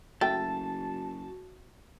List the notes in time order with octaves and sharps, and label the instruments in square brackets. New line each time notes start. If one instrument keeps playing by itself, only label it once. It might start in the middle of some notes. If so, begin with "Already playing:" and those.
[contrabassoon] F#1 [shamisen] A3 G5 [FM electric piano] F#4 [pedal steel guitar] A5